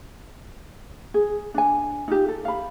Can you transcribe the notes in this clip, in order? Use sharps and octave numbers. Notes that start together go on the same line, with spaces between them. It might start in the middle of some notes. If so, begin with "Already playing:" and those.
G#4
D4 G#5
D#4 F4 G4
A4
F5 B5